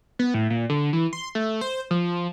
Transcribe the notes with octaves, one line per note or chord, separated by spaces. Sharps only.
B3
A2
A#2
D3
E3
C6
A3
C5
F3